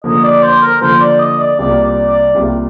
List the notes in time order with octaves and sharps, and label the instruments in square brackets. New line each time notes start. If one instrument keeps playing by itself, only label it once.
[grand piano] D3 F3 A#3 [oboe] D#5
[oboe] D5
C5
A#4
[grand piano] D3 F3 A#3 [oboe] C5
[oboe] D5
D#5
D5
[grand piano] C2 C3 G3 A#3 F4 [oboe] D5
[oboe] D5
D5
[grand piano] C2 C3 G3 A#3 F4